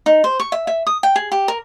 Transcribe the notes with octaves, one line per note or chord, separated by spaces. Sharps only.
D#4
C5
C#6
E5
E5
D#6
G5
G#4
G4
A#4